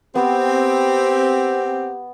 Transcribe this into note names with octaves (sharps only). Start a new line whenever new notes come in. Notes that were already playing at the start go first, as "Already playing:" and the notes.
B3 C4 G4